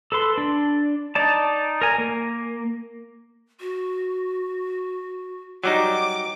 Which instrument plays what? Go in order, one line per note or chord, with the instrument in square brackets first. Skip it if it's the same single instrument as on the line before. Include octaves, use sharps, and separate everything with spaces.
[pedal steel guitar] A4 B4 C6
D4
D#4 D5 A5
A#4 G#5
A#3
[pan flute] F#4
[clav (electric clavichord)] F#3 G3 D#4 [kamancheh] D6